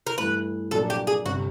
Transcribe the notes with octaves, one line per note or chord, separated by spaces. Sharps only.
A#4
G2 E3 A3 B4
A#1 A#2 F#3 A#3 D4 A4
G4
G#4
G1 C3 F#4